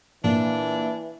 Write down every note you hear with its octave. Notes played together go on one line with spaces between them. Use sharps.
A#2 E3 D4